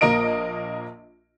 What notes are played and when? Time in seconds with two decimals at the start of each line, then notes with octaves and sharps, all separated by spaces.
0.01 A#1 A#3 A#4 D#5 D7